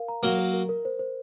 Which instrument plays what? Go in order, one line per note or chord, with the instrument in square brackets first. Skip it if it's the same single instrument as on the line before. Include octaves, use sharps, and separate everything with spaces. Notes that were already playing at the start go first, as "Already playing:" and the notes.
Already playing: [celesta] A#4 F5
A#5
[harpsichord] F#3 A#3 [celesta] A#4
[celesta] A#4
A#4
A#4
C5
C5